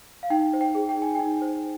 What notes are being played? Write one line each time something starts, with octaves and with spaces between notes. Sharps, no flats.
F5
D#4 G5
C5
G5
G#4
G5
D#4
G#5
D#4 G5
C5